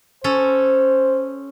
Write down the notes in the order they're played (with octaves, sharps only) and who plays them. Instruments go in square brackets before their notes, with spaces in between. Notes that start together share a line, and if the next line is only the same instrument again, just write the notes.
[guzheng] C#4 A4 [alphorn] C5